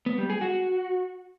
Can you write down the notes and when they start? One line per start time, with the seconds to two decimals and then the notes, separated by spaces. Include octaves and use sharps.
0.06 B3
0.18 G3
0.30 G#4
0.41 F#4